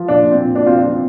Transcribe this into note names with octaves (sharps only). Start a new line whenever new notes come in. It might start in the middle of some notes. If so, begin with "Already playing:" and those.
Already playing: F3
A#2 D4
A#2
C4
A#2
A#2 D4
F3 C4 F4
D4
F3 C4